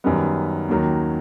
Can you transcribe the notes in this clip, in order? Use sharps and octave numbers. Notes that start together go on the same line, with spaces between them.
F#2 D#3 G3 B3
D#2 D#3 F#3